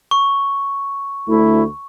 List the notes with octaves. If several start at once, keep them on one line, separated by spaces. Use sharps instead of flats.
C#6
D2 A3 E4